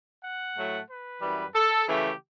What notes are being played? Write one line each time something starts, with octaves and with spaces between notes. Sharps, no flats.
F#5
A2 F#3 A3
B4
F#2 E3 G3
A4
C#3 E3 A3 G4